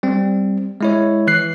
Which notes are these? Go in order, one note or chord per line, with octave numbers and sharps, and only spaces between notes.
G3 C4
G#3 E4 C#5
E3 F#6 C7